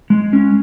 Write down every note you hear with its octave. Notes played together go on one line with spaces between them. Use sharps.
G#3
C#4